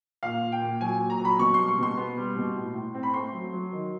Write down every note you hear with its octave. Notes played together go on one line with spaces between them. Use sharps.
A#2 F5
A#2
G5
A#2
F#3 G#5
A#2
A#5
F#3
B5
B2 C#6
G3 C6
C#6
B2 C6
B3
G3
B2
A2
A2
C4
B5
A3 C6
F#3
F#3
D#3